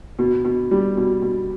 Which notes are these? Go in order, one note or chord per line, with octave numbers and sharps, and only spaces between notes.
B2
B2
G3
B2
B2